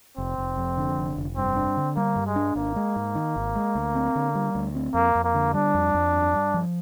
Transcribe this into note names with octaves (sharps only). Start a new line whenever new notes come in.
F1 C4
F1
F2
D3
F1
F1
G2 C4
D4
D3
G3 A#3
G2
G#3
D4
G#1 A#3
G#3
G#2
D#3
G#1
G#3
D2
C4
D3
G3
D2
C4
F2 A#3
F2
A#3
D3
G3 D4
F2
F2
G2
G2
F3